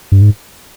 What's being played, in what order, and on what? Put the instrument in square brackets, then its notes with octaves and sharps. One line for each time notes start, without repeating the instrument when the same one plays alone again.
[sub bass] G2
G#2